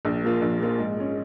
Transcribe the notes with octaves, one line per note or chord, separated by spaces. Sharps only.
A#1
A#2 F3 A#3 F4
A#1
A#2 F3 A#3 F4
G#2
G#3 C#4